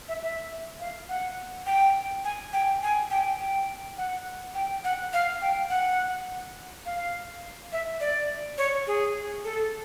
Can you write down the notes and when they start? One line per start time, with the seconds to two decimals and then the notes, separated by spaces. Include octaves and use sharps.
0.08 E5
0.23 E5
0.80 F5
1.09 F#5
1.66 G5
2.25 G#5
2.53 G5
2.83 G#5
3.10 G5
3.40 G5
3.97 F#5
4.55 G5
4.84 F#5
5.13 F5
5.42 G5
5.70 F#5
6.86 F5
7.72 E5
8.01 D5
8.58 C#5
8.87 G#4
9.44 A4